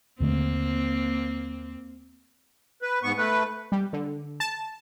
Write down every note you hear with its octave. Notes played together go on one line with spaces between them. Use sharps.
D#2 D3 A3 A#3 C4
B4
G#2 B3 C#6
A3 B4
G3
D3
A5